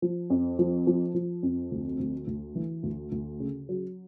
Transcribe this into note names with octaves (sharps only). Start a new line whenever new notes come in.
F3
F2
F3
F3
F3
F2
D2
D2
D2
E3
D2
D2
C#3
F#3